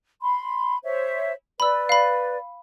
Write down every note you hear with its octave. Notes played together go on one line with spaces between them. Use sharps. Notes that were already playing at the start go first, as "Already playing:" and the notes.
B5 C6
C5 C#5 E5
B4 D5 B5 E6
F5 B5